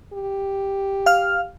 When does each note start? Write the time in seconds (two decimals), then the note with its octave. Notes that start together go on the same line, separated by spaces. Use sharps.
0.13 G4
1.06 F5 F6